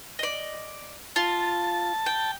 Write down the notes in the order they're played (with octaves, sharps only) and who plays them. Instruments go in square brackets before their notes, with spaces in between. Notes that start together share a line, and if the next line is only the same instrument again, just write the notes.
[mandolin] D5 D#5
[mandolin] F4 [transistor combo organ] A5
[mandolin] G5